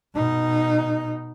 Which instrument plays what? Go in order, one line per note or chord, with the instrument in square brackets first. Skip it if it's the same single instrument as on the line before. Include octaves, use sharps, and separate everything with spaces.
[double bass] B2 D#4